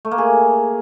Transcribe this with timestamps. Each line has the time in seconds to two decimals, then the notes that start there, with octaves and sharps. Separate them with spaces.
0.05 A3
0.11 A#3
0.18 G#4